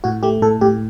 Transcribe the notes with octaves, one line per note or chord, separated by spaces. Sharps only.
A2 F#4
A3 G4
A2 A4
A2 G4